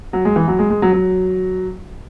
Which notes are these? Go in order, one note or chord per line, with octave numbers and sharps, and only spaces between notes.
F#3
G#3
E3
F#3
G#3
G#3
F#3
F#3